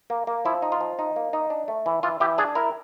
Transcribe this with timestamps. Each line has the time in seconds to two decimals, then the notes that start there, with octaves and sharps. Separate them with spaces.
0.10 A#3
0.27 A#3
0.45 F3 E4
0.62 D#4
0.72 F4
0.81 F3
0.99 D#4
1.16 A#3
1.33 D#4
1.50 D4
1.68 A3
1.86 E3
2.03 E3 F4
2.20 E3 G4
2.38 D4 G#4
2.55 E4 A#4